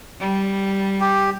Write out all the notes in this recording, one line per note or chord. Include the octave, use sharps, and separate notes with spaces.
G3
G4